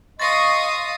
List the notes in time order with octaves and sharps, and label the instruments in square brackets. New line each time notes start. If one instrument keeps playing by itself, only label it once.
[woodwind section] D#5 C6 C#6 [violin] F5 D#6 [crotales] A6 A#6 C7